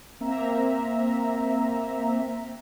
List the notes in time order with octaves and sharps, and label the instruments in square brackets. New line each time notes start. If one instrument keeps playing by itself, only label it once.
[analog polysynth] A#3 C4 E5 A#5